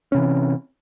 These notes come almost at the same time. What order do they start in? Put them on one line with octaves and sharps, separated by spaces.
C#4 C3 E3